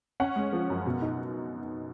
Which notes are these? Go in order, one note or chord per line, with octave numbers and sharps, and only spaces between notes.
C#4 F#5
G#3
F3
F#2
B2
D#4